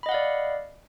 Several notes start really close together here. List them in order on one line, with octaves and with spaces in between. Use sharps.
B5 D#5 F#5 F5 D5